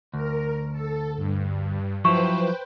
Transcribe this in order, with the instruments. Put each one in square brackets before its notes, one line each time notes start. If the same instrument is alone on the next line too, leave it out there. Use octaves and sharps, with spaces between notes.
[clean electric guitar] D2 [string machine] A#4
[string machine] A4
G2
[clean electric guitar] F3 F#3 E4 [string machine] B4 C5 G5 [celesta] C#6